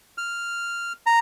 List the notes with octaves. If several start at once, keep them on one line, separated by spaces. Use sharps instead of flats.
F6
A#5